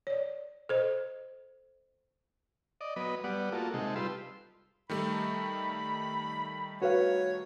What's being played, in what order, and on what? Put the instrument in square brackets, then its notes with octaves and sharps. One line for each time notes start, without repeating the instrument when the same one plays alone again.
[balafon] C#5 D5
A4 C5 D#5
[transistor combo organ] D5 D#5
F#3 B3 D#5 B5
G3 B3 D5 F#5
A#3 F4 F#4 A4
C3 G#3 D#4 A4
G3 F4 B4 C6 E6
[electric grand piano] D#3 G3 A3 [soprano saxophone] B5
[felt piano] F#4 B4 F5 [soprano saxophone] C#5